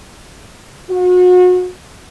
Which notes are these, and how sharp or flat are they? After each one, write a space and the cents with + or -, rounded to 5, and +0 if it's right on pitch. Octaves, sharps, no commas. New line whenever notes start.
F#4 -35